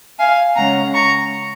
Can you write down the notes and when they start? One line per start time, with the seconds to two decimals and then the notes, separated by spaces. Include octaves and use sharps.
0.19 F5 G#5
0.56 C#3 G#3 C#4 F#5 A#5
0.94 A#5 C#6